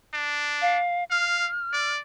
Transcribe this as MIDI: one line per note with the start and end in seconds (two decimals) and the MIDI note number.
0.14 0.78 62
0.62 1.04 77
1.10 1.50 77
1.10 1.91 89
1.73 2.00 74